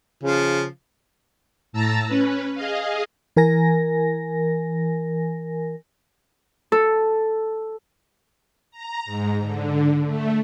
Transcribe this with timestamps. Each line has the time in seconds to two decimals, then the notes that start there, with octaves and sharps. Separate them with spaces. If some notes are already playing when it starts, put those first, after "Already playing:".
0.23 C#3 F3
1.73 A2 A5 A#5 E6 A6 A#6
2.07 C#4 B4
2.55 G#4 D#5 F5
3.36 E3 A#4 G#5 A#6
6.72 A4
8.71 A#5
9.06 G#2
9.41 D3
10.05 A3